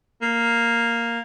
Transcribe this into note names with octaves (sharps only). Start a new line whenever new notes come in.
A#3